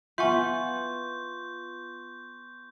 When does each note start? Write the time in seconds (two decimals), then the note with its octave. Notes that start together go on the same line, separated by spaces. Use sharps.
0.18 B3 F4 E5 F#5 G#5 C6 C#6 G6